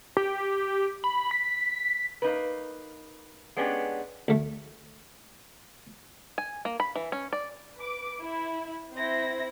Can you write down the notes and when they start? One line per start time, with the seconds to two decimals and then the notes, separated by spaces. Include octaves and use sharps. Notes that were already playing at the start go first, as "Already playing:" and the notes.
0.17 G4
1.04 B5
1.31 B6
2.22 A#3 D#4 B4
3.57 G#3 B3 C#4 D4 G4
4.28 D2 A3
6.38 G#5
6.65 A#3
6.80 B5
6.96 E3
7.12 C#4
7.33 D5
7.75 B4 D6
8.23 E4
8.93 C4 E4 C5 A#6